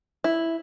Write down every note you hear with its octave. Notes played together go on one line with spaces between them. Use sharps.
E4